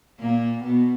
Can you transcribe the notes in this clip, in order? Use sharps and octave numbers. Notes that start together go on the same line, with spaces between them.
A#2 A#3
B2 B3